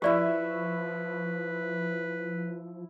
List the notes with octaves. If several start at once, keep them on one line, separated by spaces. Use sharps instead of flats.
F3 E4 G4 B4 D5 E5 C#6